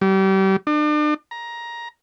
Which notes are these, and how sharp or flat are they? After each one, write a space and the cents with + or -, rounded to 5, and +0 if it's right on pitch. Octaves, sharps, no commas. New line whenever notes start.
G3 -30
D4 +40
A#5 +15